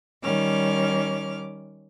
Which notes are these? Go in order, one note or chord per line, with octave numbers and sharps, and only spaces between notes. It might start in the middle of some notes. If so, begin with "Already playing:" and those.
D#3 G3 C#4 D6 F6